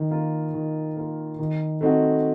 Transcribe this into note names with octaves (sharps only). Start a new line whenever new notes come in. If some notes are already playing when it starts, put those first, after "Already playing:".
Already playing: D#3
A#3 F4
D#3
A#3 F4
D#3
A3 C4 D#4 F#4